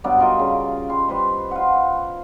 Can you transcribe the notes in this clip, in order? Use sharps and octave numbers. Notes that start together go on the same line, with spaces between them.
G2 F#3 B3 D5
F4 A#4 D#5
C#3
G3 C6
G3 B4 C5 C6
F4 F#5